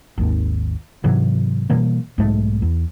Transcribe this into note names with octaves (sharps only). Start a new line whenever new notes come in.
G#1 D#2
G#2 C3 E3 F#3
B2 E3 G3 A#3
B1 G#2 G#3 A3
E2